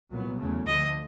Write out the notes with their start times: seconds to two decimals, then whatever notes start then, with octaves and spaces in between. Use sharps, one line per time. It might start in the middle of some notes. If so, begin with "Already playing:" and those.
0.10 C2 A#2 F#3 B3
0.38 E2 C#3 F#3 A3
0.67 D2 D3 F3 A3 D#5